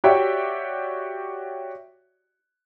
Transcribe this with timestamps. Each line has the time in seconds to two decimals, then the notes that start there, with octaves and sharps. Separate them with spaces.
0.04 F#4 G4 C#5 D5 E5 G5